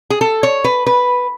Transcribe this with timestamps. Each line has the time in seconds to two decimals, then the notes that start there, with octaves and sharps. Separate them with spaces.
0.10 G#4
0.21 A4
0.43 C#5
0.64 B4
0.87 B4